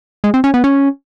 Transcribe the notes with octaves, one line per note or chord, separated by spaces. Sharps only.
G#3
C4
C#4
B3
C#4